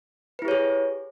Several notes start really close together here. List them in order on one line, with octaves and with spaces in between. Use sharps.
B4 E4 G4 C#5 G#4